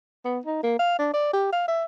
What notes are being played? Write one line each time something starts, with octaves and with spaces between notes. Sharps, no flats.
B3
D#4
A#3
F5
D4
D5
G4
F5
E5